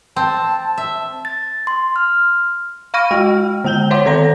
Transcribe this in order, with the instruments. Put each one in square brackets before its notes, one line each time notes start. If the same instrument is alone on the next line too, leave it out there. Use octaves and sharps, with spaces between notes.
[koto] C4 [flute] A5
[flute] A5
[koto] E5
[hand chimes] A6
C6
F6
[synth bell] F5 B5 C#6 F6 A#6 D#7
G#3 F#4 G5 F6
D3 G#3 G5 G6 G7
C5 C#5 E5 F#5 C6 D6
D#3 A4 C5 A#5 A#6